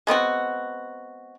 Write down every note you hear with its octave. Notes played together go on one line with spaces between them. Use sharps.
G#3 B3 C4 F#4